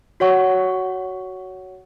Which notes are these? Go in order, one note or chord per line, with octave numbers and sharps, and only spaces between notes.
F#4 C#5 F#5 C#6